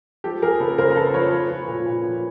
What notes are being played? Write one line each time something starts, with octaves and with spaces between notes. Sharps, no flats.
F3 G4 A4
F3 G#4 A#4
C#3 A4 B4
C#3 A#4 C5
A#4
F3 A4 B4
F3 B4 C#5
F3
F3
A#2
A#2
F3